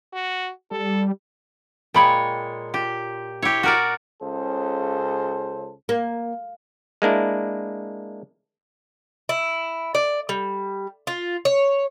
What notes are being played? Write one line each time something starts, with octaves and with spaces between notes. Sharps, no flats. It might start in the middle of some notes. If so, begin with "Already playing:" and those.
F#4
G3 A4
A#2 G#3 C#5 G5 B5
F4 G4
E4 G4 C#5
F#4 A#4 D5
C#2 C#3 A4 C5
A#3
G#3 A#3 D4 E4
E4
D5
G3
F4
C#5